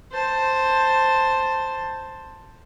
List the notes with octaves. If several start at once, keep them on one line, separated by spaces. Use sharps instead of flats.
C5 A5